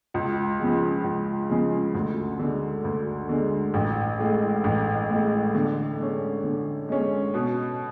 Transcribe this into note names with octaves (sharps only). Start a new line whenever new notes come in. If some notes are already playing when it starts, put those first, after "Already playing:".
C#2
C#3 F3 G#3
C#2
C#3 F3 G#3
D2
D3 G#3
D2
D3 G#3
A1
A2 G#3
A1
A2 G#3
D3
G#3 C#4
D3
G#3 C#4
B2